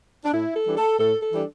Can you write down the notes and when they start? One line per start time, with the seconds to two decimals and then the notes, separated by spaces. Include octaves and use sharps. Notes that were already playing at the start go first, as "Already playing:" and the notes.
0.24 D4
0.33 A2 E4
0.55 A4
0.66 E3 G3 D4
0.77 A4
0.98 A2 A4
1.21 A4
1.31 E3 G3 D4